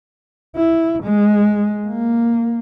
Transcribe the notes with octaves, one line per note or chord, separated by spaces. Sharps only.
E4
G#3
A#3